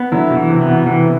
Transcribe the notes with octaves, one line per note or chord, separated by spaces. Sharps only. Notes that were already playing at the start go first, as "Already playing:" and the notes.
Already playing: B3
D3 F#3 E4
B2
E3
C3
B3
B2
C3 E3